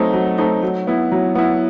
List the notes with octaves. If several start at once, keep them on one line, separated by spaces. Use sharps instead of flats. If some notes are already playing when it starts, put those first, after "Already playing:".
Already playing: F#3 A3 C4 D#4
F#3
A3 C4 D#4
F#3
B3 E4
F#3
B3 E4